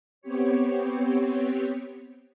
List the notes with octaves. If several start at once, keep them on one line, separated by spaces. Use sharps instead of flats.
B3 C4 G4 C#5